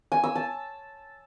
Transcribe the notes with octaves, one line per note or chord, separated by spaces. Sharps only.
G#5
E6
A5